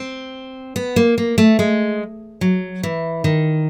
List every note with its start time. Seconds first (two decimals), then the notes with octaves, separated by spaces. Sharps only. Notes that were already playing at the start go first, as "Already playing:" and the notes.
Already playing: C4
0.76 B3
0.96 A#3
1.18 A#3
1.38 A3
1.59 G#3
2.41 F#3
2.83 E3
3.24 D#3